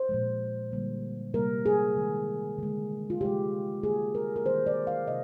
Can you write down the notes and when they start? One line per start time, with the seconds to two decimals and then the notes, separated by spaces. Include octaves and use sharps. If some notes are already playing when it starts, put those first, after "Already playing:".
Already playing: C5
0.09 A#2 F3 G#3
0.72 D3 G3 A#3
1.34 C3 G3 A#3 A#4
1.66 G#4
1.97 D#3 G#3
2.58 D3 G#3
3.10 F4
3.21 C3 F3 G#3 G4
3.83 D3 G3 A#3 G#4
4.15 A#4
4.36 A#4
4.45 D#3 G3 A#3 C5
4.67 D5
4.87 F5
5.07 C3 D#5